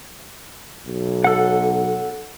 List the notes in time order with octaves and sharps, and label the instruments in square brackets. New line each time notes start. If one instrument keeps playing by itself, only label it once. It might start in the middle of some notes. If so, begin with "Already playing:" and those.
[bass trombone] B1
[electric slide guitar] A4 F#5